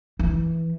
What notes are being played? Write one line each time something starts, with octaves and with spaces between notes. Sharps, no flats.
E3